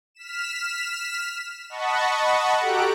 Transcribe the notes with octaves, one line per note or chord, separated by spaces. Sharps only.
F6 B6 E7
D#5 F#5 A5 B5 C#6
F#4 G4 A4 A#5 F#6 D7